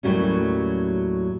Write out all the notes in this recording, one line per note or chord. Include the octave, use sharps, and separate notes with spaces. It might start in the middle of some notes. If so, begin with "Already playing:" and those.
D#2 A2 C3 F#3 G3 C#4